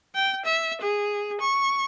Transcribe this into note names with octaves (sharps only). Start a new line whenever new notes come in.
G5
E5
G#4
C#6